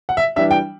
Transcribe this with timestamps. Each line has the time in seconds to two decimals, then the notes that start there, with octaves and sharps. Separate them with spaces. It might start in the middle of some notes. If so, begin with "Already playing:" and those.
0.09 F#5
0.17 E5
0.36 E3 G3 D4 E5
0.51 G5